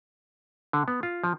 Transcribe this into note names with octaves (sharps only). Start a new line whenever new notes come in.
D3
B3
F4
F3